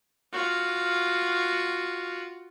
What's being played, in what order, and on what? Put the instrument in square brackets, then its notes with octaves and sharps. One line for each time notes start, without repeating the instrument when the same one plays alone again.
[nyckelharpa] F4 F#4